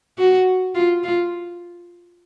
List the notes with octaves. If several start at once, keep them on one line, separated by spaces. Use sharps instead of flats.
F#4
F4
F4